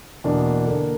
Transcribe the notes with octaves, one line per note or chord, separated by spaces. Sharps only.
E2 B2 A#3 D4
D3 A#3 D4